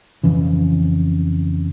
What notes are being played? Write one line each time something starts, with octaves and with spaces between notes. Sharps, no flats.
F2 C#3 E3